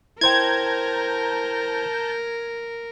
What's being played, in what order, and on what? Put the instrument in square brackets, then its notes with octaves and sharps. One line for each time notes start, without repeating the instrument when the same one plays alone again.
[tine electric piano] E4 C5 G5 [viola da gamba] A#4 [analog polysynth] A5 A#5 G6 [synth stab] G#6